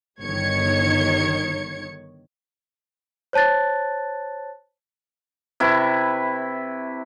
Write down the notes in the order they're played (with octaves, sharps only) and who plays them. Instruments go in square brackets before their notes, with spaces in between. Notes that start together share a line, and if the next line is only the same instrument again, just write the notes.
[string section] G1 D#3 C#5 G#6 C#7
[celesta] C5 C#5 A5 F#6 A6
[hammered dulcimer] C3 E4 B4 C#6